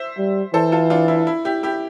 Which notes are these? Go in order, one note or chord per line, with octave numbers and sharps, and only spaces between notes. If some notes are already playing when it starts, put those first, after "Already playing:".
Already playing: C5 E5
G3
E3 A4 C5
F4 A4
D4 F4
E4
E4
E4 G4
E4 G4